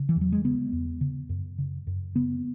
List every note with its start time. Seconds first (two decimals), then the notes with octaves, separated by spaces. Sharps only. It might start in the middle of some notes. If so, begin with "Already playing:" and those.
Already playing: C#3
0.09 E3
0.16 E2
0.21 F#3
0.32 G#3
0.44 C#3 B3
0.73 E2
1.01 C#3
1.29 F#2
1.58 C#3
1.87 F#2
2.16 C#3 B3